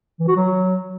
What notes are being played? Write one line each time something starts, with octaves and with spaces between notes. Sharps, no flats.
E3
F#4
F#3